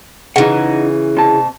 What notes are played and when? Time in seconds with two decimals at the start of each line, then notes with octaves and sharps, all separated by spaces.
0.36 C#3 E3 D#4 F#5
1.17 C3 A5